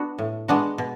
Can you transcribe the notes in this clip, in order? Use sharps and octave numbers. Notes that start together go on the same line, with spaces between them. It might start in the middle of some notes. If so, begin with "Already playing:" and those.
Already playing: B3 D4 F#4
A2
G#3 B3 D4 F#4
B2